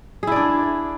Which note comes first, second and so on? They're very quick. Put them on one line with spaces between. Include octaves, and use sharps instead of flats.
G#4 E4 D5 D4